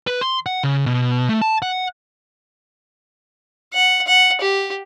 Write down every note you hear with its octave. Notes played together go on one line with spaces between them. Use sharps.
B4
C6
F#5
C#3
B2
A3
A5
F#5
F#5
F#5
G4